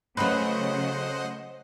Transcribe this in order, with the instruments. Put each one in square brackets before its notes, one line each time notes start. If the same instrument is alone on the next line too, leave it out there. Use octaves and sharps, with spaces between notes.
[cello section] C#3 F#3 [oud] A3 B4 [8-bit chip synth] C5 D#5 F#5